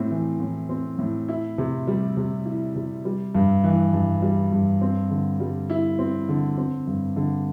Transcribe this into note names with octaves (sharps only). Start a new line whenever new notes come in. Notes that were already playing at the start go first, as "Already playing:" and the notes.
Already playing: A2 C4
E3
A2
C4
A2
E4
C3
G3
C3
E4
C3
G3
G2
E3
G2
G3
G2
C4
D3
G3
E4
C4
D3
C4
G2
D3